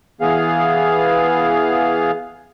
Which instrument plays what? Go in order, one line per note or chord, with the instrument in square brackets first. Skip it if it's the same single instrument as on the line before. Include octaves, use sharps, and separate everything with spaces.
[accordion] E3 B3 G#4 F5